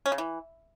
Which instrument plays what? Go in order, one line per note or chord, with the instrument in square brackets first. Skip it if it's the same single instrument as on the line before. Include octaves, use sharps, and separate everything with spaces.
[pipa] C#4
C#3
E3